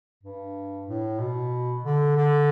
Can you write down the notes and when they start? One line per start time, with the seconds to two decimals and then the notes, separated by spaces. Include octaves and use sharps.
0.23 G2
0.87 A2
1.19 B2
1.84 D3
2.16 D3